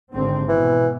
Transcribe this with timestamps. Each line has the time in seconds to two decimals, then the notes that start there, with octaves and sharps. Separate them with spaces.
0.14 G#1 D3 C4
0.49 B2 E3